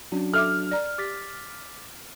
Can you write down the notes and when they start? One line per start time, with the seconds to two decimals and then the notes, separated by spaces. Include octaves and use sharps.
0.12 F#3 C#4 D4 F#4
0.34 A4 E5 D6 F6
0.71 D5 A#5
0.98 G4 D6 A6 B6